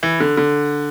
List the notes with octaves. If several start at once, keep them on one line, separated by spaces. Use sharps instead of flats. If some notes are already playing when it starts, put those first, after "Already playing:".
E3
D3
D3